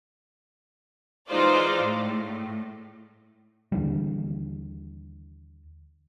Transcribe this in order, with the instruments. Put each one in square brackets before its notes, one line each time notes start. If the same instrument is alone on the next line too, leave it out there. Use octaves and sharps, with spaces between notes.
[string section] E3 G#3 D#4 F4 C5 D5
A2
[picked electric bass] D#2 D3 E3 G3